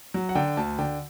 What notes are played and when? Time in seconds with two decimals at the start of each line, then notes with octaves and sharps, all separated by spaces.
0.14 F#3
0.29 F#5
0.35 D3 G5
0.57 D2 A5
0.79 D3 G5